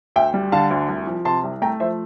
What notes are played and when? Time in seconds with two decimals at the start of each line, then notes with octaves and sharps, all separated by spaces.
0.16 D2 E5 G5
0.34 G3
0.52 D3 F5 A5
0.71 D2
0.89 C2
1.07 F3
1.25 C3 A5 C6
1.44 C2
1.62 A3 G5 A#5
1.80 F3 C5 E5